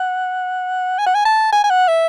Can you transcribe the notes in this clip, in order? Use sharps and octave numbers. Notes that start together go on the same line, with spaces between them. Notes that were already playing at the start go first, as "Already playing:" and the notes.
Already playing: F#5
G#5
F#5
G#5
A5
G#5
G#5
F#5
E5